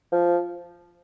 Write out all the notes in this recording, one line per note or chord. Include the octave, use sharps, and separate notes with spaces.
F3